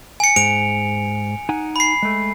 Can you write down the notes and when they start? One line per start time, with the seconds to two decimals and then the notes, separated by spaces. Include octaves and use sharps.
0.20 G#5 C#7
0.36 G#2 D7 F7
1.49 D#4 F#5 G#5
1.76 B5 C7
2.03 G#3 A3